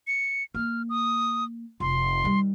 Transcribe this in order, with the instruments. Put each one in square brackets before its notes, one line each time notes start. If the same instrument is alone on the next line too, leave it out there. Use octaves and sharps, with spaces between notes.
[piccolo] C#7
[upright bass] A#3 [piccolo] F6
[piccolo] D#6
[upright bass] F1 [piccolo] C6
[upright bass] D#3 G3